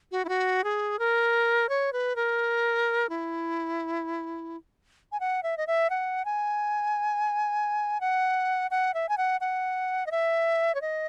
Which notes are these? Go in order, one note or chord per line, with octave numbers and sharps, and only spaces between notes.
F#4
E4
F#4
G#4
A#4
C#5
B4
A#4
E4
G#5
F#5
E5
D#5
E5
F#5
G#5
F#5
F#5
E5
G#5
F#5
F#5
D#5
E5
C#5
D#5